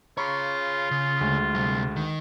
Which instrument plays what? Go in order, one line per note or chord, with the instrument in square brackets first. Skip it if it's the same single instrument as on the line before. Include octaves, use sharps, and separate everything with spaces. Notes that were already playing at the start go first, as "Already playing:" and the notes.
[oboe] F4 [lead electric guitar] G#4 C#5 [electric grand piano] A#5 B5 C#6
[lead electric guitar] C#3
[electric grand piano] D2 G#3
[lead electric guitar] C3 G3
D#3